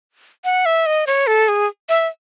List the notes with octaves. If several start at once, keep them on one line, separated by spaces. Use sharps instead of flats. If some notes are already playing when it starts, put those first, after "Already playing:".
F#5
E5
D#5
C#5
A4
G#4
E5